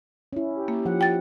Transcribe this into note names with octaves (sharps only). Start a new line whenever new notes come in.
C#4 E4
G4
A#3
F3 F#5
G5 A6